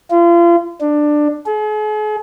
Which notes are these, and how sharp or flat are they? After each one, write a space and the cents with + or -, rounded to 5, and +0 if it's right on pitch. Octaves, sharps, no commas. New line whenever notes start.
F4 -35
D4 +15
G#4 +45